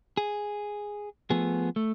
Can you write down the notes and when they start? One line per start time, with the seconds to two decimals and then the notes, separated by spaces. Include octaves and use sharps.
0.17 G#4
1.30 F3 A3 B3 G#4
1.76 A3